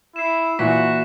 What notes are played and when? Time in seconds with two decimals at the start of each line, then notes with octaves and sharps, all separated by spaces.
0.16 E4 C7 E7
0.59 A#2 E3 F#4 B6